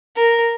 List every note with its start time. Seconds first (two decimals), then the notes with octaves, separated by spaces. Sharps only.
0.16 A#4